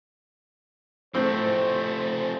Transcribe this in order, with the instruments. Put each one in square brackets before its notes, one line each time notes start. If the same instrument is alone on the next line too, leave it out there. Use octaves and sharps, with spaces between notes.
[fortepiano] A2 C4 [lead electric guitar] F3 A3 [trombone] C5